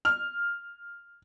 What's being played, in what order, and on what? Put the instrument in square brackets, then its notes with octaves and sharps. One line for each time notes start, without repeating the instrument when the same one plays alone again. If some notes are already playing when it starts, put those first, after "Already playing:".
[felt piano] F6